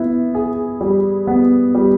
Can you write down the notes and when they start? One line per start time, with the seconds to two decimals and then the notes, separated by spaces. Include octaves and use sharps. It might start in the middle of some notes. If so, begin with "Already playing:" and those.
Already playing: B3 E4
0.35 G#4
0.81 G3
1.27 B3
1.75 G3